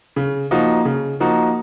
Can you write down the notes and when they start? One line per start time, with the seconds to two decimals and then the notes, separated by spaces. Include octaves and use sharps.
0.16 C#3
0.51 F3 A#3 D#4 F#4
0.85 C#3
1.20 F3 A#3 D#4 F#4